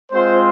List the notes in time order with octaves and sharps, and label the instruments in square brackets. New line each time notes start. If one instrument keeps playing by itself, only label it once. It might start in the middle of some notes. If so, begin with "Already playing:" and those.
[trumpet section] G#3 C4 F4 C5